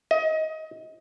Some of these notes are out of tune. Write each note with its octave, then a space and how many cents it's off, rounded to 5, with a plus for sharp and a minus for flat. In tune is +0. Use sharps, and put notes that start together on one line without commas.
D#5 +25